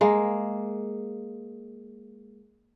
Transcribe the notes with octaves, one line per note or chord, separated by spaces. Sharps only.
G#3 A#3